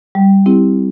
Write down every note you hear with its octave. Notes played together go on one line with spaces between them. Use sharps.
G3
C4 E4 G4